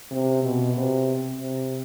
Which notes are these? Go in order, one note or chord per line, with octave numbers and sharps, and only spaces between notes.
C3
B2
C3
C3